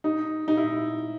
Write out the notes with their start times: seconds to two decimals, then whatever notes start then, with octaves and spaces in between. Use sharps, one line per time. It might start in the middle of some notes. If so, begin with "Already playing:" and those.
0.04 D#4
0.48 D#4
0.57 E4